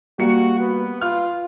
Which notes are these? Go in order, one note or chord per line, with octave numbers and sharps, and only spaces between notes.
G3 A#3 F#4 C#7
B3
F4 F6